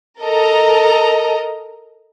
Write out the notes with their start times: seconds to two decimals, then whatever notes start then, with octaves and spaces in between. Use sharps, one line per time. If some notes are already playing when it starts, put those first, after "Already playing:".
0.21 A4 A#4 D#5 A#5